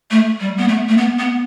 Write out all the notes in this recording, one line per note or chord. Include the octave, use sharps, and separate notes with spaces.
A3
G3
B3
A3
A3
B3
B3